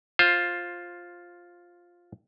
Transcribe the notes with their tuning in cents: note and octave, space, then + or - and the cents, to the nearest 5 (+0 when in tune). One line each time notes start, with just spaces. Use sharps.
F4 +5 C5 +15